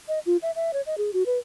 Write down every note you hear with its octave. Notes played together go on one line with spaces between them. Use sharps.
D#5
F4
E5
E5
C#5
D#5
G#4
F#4
B4